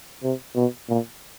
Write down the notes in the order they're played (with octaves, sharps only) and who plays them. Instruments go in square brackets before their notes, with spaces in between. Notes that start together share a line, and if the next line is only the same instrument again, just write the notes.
[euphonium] C3
B2
A#2